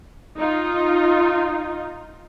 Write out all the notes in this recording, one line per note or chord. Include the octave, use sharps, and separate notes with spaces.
D#4 F4